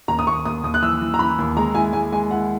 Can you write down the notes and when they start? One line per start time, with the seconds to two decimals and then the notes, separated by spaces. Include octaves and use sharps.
0.08 D#2 A#5
0.19 D#6
0.26 D#2 C#6
0.45 D#2 D#6
0.63 D#2 D#6
0.74 F#6
0.82 E3 E6
1.01 E3
1.14 A#5
1.19 E3 B5
1.38 D#2
1.57 G#3 A#5
1.74 E4 G#5
1.93 G#3 G#5
2.12 G#3 G#5
2.31 E4 F#5